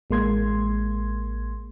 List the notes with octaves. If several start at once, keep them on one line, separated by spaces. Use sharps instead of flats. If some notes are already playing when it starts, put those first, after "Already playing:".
A1 G#3 A#3 C6 G#6